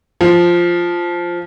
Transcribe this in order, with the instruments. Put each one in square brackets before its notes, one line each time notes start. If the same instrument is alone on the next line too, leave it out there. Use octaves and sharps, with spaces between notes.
[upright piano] F3